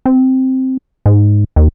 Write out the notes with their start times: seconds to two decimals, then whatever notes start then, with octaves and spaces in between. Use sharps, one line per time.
0.06 C4
1.06 G#2
1.56 D#2